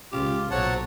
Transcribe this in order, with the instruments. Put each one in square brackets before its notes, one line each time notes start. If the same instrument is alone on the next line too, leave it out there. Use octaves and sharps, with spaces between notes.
[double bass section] C#2 [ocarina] C#4 [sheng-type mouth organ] F4 [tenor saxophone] G4
[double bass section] B1 A#2 [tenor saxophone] F#3 [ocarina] C5 [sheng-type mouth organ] C#5 F#5 A5